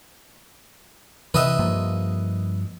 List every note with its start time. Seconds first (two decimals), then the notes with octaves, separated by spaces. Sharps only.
1.34 C3 E3 B4 D#5 E5
1.59 G2 F3 A#3